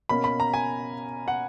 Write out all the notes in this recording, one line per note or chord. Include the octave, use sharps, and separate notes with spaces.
B2 A#3 C#4 B5
B5
A#5
G#5
F#5